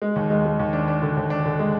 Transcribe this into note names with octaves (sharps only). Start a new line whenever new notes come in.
G#3
D#2
G#3
G#3
D#2
D4
D4
D3
D#2
D4
D3
G#3